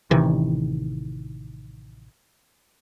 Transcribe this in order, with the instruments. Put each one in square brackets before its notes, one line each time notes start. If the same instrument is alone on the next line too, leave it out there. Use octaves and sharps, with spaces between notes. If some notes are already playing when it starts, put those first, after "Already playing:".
[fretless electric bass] A1 C3 D#3 E3